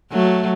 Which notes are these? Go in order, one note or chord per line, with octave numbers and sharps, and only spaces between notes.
F#3 A3